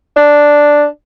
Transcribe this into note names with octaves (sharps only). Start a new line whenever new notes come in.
D4